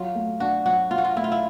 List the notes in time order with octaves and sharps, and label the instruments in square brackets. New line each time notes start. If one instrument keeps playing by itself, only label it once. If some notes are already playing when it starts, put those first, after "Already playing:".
Already playing: [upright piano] F#3 [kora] F4
[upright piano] A3
[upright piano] D4 [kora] F#4
[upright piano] F#3 [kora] F#4
[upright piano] F#3 [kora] F4
[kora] F#4
F4
[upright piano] A3 [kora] E4
[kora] F4
E4